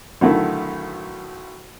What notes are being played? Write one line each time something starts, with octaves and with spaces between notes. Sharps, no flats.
B1 D3 D#3 A3 E4 A#4